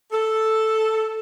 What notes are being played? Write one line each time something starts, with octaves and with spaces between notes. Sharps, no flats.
A4